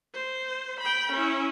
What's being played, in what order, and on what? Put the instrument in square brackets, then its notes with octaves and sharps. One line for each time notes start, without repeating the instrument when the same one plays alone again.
[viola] C5
G5 B5
C#4 E4